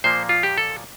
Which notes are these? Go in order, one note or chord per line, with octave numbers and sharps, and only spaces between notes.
A#2 F3 A#3 C5
F4
G4
A4